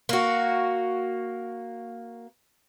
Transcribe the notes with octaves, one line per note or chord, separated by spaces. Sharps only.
A#3 F#4